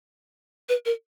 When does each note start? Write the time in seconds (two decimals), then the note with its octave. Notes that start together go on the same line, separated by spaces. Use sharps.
0.69 B4
0.86 A#4